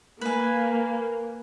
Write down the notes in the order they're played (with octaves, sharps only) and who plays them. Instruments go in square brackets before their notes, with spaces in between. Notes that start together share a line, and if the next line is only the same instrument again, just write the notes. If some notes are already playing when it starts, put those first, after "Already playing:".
[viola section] A#3 [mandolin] B4 G#5